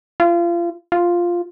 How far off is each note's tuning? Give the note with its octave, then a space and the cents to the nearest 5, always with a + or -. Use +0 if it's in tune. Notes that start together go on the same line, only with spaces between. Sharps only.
F4 -30
F4 +0